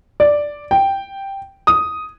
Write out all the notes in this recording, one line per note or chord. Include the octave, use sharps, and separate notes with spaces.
D5
G5
D#6